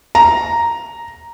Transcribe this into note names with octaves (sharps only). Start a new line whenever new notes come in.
A#5